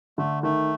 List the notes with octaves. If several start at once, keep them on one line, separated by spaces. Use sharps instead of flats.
D3 A3
D#3 A3